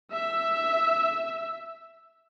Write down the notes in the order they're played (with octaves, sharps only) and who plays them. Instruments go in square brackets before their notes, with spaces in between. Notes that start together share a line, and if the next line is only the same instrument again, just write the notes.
[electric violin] E5 E6